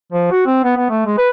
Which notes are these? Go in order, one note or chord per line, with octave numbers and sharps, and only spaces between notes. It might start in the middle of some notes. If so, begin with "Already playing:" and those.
F3
F#4
C4
B3
B3
A3
G#3
B4